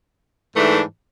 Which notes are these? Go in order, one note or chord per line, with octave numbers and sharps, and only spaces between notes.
G#2 E3 A3 D4